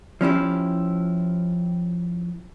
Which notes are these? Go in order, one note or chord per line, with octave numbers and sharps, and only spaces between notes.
F3 C#4 E4 G4